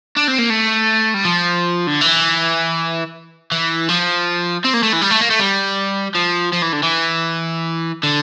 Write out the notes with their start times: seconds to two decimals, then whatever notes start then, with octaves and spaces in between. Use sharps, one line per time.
0.16 D4
0.28 C4
0.38 A#3
0.50 A3
1.14 G3
1.25 F3
1.87 D3
2.01 E3
3.52 E3
3.89 F3
4.65 C4
4.74 A#3
4.83 A3
4.93 E3
5.02 G3
5.11 A3
5.21 A#3
5.30 A3
5.40 G3
6.15 F3
6.53 F3
6.62 E3
6.73 D3
6.83 E3
8.03 D3